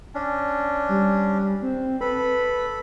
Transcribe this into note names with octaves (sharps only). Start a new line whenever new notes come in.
C#4 D4
G3
C4
A4 B4 B5